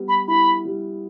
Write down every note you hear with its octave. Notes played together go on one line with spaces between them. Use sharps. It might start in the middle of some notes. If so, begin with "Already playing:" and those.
Already playing: G3 B3
B5
E4 B5
G3